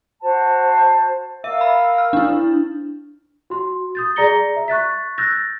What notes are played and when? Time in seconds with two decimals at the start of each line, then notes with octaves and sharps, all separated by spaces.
0.21 F#4 C5 A5
1.44 A#4 E5 F5 E6
1.61 B5
1.98 F6
2.13 D4 E4
3.50 F#4 C6
3.95 D#6 G6 A6
4.16 G#4 D5 A#5 A#6 C#7 G7
4.56 E5
4.68 C#6 F#6 A6 B6
5.18 E6 F#6 G6 A6 A#6